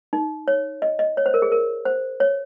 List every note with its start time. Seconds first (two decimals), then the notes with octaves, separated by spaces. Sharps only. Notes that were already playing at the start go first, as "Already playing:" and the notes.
0.13 D#4
0.48 C#5
0.82 D#5
0.99 D#5
1.17 C#5
1.26 C5
1.34 A#4
1.42 G#4
1.52 A#4
1.85 C5
2.20 C#5